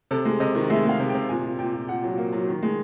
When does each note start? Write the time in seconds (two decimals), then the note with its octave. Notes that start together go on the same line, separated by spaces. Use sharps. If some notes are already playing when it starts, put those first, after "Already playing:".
0.11 C3 A4
0.25 G#3
0.40 C3 D#5
0.55 D#3
0.70 G#3 E5
0.85 G#3 F5
1.00 C3
1.09 G5
1.14 C3
1.29 A#2 G#5
1.44 A#2
1.59 A#2 G5
1.74 A#2
1.88 A#2 F#5
2.03 F#3
2.18 A#3
2.33 F#3
2.47 D#3
2.63 G#3